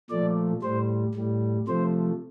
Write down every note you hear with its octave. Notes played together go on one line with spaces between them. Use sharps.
A#2 F3 A3 D5
A2 G3 C5
A2 G3
C3 F3 A3 C5